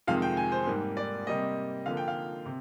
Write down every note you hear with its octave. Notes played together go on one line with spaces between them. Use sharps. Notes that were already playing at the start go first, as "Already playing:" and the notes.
F2 C3 D#3 G#3 F5
G5
G#5
C5
G#2 G3 A#3
D5
C3 G3 A#3 D#5
D3 F3 A#3 F5
G5
F5
C3